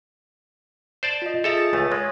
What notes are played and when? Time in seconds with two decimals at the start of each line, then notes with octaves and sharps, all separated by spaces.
1.03 C5 D5 A5
1.22 F4 D#5
1.44 F4 G#4 A4 E5 A5 A#5
1.58 A6
1.73 C#2 A3 G#5
1.92 G#3 C#5